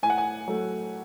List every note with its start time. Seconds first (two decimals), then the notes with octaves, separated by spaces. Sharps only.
0.03 A2 G#5
0.10 F#5
0.18 G#5
0.48 F#3 A3